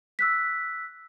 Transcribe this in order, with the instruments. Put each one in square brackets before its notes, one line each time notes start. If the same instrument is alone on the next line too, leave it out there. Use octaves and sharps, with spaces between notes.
[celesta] E6 F#6 B6